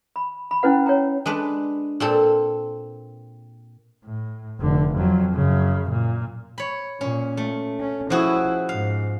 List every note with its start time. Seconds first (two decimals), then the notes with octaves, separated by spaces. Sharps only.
0.16 B5
0.51 B5
0.63 C#4 E4 B4 F#5
0.86 C#5 G5 A#5
1.26 G#3 D4 B4
2.00 A#2 C4 A4
4.05 A2
4.61 F1 D3
4.94 F2 F#3
5.35 F#2 C#3
5.90 A#2
6.58 C#5 B5
7.01 A#2 C#4
7.37 A3
7.80 C#4
8.10 F3 E4 F#4 G#4
8.69 G#2 F5